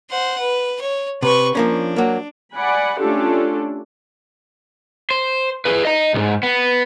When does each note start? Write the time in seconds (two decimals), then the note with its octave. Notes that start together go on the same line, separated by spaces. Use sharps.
0.10 C5 F#5
0.39 B4
0.81 C#5
1.23 C3 B4 C#6
1.55 F3 A#3 C#4 D4
1.96 F#3 A#3
2.54 D5 F#5 G#5 B5
2.98 A3 C#4 D4 F4 G4 A4
5.11 C5
5.65 G#4 B4
5.85 D#5 A#5
6.14 C2 G#2
6.43 B3